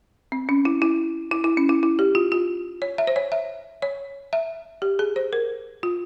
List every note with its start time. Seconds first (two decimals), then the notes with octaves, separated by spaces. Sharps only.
0.32 C4
0.49 C#4
0.65 E4
0.82 E4
1.32 E4
1.44 E4
1.57 C#4
1.69 E4
1.83 E4
1.99 G4
2.15 F4
2.32 F4
2.82 C#5
2.98 E5
3.07 C5
3.16 C#5
3.32 E5
3.82 C#5
4.33 E5
4.82 G4
4.99 G#4
5.16 C5
5.33 A#4
5.83 F4